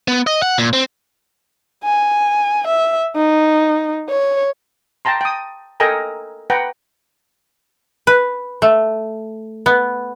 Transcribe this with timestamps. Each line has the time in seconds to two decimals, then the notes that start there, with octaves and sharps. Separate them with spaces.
0.08 B3
0.27 D#5
0.42 F#5
0.58 A#2
0.73 C4
1.84 G#5
2.67 E5
3.16 D#4
4.09 C#5
5.05 G5 A5 A#5 C6
5.21 G5 D#6
5.80 A4 A#4 D#5 G5 G#5 A#5
6.50 B4 F#5 G5 A#5
8.07 B4
8.62 A3
9.66 B3